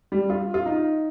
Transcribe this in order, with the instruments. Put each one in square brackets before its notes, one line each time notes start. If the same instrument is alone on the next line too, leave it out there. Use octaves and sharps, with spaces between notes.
[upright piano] G3
F4
F4
D#4